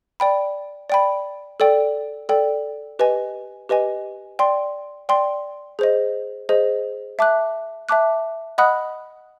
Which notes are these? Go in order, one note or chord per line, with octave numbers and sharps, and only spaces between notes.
D5 G5 B5
D5 G5 B5
A4 D5 G5
A4 D5 G5
G4 B4 D#5 G#5
G4 B4 D#5 G#5
D5 G5 C6
D5 G5 C6
G#4 C5 D#5
G#4 C5 D#5
E5 A5 D6 F#6
E5 A5 D6 F#6
D#5 F#5 B5 D#6 F#6